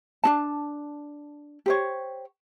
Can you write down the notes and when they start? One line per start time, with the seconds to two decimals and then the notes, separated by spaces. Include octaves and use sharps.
0.24 D4 D#4 A5
1.66 G4 C5 C#5